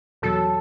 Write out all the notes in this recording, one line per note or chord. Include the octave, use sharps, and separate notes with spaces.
E2 B2 F#3 A4